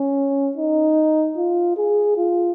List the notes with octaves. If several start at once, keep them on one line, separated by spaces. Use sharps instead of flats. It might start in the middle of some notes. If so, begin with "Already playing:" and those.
Already playing: C#4
D#4
F4
G#4
F4